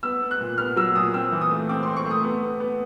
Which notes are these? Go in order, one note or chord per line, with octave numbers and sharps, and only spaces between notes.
B3 E6
B3
F#6
A#2
B3 F6
F#3 E6
A#2 D#6
C4 E6
E3
D#6
A3
C4 D6
C6
C4
C#6
A3
D#6
B3
B3
B3